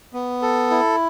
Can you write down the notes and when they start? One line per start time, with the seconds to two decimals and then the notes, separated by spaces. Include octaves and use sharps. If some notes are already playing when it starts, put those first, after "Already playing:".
0.13 B3
0.42 A4
0.70 E4